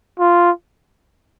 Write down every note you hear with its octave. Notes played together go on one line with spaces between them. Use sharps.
F4